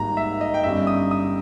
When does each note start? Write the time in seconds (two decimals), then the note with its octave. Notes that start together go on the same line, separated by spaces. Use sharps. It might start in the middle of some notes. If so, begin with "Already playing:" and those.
Already playing: G#1 G#2 G3 A#3 A#5
0.17 E5
0.41 D#5
0.54 G5
0.63 G1 G2 G3 C#4 E5
0.87 D#6
1.11 D#6